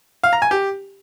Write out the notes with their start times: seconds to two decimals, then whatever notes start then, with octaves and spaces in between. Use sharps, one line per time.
0.23 F5
0.33 A#5
0.42 G#5
0.51 G4